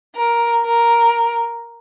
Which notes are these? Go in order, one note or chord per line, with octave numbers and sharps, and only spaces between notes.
A#4
A#4